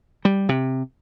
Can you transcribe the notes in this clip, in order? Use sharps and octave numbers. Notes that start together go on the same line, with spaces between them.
G3
C3